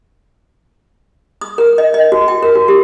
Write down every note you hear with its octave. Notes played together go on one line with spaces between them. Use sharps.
D#6
A#4
D#5
D#5
F#4
G5
A#4
F#4
G4